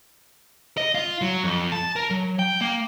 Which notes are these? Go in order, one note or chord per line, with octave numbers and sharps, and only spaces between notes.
D#5
F4
F#3
F2
A5
A#4
F#3
G5
A#3